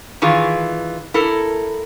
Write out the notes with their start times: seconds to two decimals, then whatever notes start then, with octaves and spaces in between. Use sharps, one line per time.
0.22 D#3 E3 F4 G#4
1.14 E4 A4 A#4